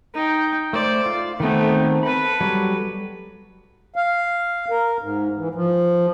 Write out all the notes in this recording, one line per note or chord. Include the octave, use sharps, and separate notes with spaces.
D#4 G5
A3 C5 D5
F4
D#3 A3 B3 C4
A4 B4 B5
F#3 G3
F5
A#4
G#2
E3
F3